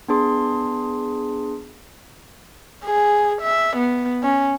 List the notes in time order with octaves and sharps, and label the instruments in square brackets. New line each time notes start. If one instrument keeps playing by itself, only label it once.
[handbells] B3 D4 G#4 C6
[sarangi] G#4
E5
B3
C#4